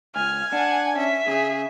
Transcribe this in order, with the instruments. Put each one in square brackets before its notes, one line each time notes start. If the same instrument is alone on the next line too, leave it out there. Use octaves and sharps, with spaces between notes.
[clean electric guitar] C#2 [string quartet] G#5 [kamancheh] F6
[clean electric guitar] D4 [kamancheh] F#5
[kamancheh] C#4 [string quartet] E5
[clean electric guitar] C#3 [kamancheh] G#4